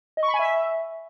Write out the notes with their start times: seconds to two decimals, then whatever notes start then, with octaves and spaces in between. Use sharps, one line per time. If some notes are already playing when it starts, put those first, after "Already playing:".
0.17 D#5
0.23 C#6
0.28 B5
0.34 G#5
0.39 E5